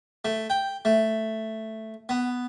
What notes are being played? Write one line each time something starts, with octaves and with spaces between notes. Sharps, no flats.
A3
G5
A3
B3